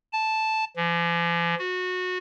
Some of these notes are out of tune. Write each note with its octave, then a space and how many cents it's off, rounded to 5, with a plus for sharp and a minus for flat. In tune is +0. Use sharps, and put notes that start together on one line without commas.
A5 -5
F3 -45
F#4 -20